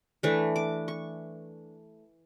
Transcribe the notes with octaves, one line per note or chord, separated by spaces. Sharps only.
E3 A3 D4 C#6
D6
C#6